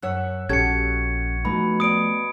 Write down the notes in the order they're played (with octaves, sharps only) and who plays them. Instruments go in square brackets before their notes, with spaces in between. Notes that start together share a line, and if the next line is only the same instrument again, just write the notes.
[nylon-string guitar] F#2 C#5 [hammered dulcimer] E5 F#5
[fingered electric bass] A#1 [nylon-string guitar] C#4 G4 A4 [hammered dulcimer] F#4 [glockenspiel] G#6 C#7
[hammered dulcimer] B2 [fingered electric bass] F3 A3 [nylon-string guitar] D#4 [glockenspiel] B5
[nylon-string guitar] B3 D5 [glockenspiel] D#6 D7